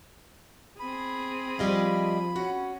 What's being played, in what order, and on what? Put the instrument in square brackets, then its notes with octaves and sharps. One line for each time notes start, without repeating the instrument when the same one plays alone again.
[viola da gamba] C4 G#4 [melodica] B5
[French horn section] F3 [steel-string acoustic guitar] G3 D#5 F5
[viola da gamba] C#4 [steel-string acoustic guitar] F#4